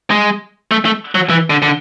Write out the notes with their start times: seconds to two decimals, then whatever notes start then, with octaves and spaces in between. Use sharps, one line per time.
0.11 G#3
0.71 A3
0.85 A3
1.15 F#3
1.30 E3
1.50 D3
1.62 D3